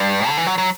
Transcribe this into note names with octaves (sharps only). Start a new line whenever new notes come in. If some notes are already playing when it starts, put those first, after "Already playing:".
Already playing: G2
D3
E3
F#3
F#3